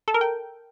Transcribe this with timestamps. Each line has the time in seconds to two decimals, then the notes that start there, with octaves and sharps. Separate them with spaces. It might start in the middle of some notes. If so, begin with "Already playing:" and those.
0.08 A4
0.14 A#4
0.21 G5